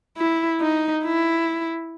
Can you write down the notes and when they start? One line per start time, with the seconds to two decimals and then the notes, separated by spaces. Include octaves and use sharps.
0.17 E4
0.61 D#4
1.04 E4